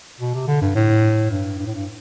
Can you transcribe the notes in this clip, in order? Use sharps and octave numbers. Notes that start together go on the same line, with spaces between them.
B2
C3
D3
G2
A2
G2
G2
A2
G2